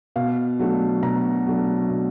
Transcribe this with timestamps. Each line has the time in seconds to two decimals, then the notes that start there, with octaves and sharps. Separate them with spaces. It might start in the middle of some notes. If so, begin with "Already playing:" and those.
0.16 B2 F5
0.59 F#3 A3 D4
1.02 B2 A#5
1.47 F#3 A3 D4
1.90 B2